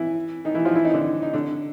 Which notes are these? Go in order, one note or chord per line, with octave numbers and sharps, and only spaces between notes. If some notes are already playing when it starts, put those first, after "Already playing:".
Already playing: E3 E4
D#3 D#4
E3 E4
F3 F4
E3 E4
D#3 D#4
D3 D4
D#4
D3 D4